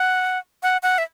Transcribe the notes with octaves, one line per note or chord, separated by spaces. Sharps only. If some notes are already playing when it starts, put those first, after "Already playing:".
Already playing: F#5
F#5
F#5
E5